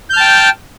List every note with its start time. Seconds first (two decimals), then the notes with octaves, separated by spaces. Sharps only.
0.10 G6
0.13 F6
0.17 A5
0.20 G5